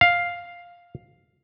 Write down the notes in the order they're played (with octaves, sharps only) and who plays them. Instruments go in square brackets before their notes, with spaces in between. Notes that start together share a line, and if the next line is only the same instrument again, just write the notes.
[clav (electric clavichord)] F5